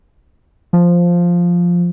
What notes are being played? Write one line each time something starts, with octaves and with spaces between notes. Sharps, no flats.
F3